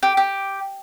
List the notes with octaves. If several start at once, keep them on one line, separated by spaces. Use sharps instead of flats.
G4
G4